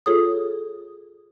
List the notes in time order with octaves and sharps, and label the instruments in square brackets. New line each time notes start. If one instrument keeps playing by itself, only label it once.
[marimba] F4 G#4 A4 C#5 D#6